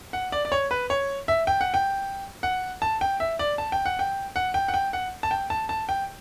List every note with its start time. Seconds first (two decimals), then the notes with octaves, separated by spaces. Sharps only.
0.13 F#5
0.32 D5
0.45 D5
0.52 C#5
0.71 B4
0.90 C#5
1.28 E5
1.47 G5
1.61 F#5
1.74 G5
2.43 F#5
2.82 A5
3.01 G5
3.20 E5
3.39 D5
3.58 A5
3.72 G5
3.86 F#5
3.99 G5
4.36 F#5
4.54 G5
4.68 F#5
4.74 G5
4.93 F#5
5.23 A5
5.31 G5
5.50 A5
5.69 A5
5.89 G5